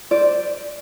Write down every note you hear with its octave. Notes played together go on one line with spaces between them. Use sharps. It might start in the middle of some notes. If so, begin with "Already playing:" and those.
C5 D5